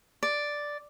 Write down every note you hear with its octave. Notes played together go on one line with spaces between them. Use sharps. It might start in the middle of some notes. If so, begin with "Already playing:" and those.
D5